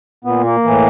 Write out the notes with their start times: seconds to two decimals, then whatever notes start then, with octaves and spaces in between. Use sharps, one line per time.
0.24 A#2 B3
0.44 A#3
0.64 A2 E3